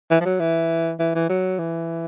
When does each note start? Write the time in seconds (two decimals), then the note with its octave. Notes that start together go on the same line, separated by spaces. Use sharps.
0.11 E3
0.21 F3
0.26 F#3
0.40 E3
1.00 E3
1.15 E3
1.29 F#3
1.59 E3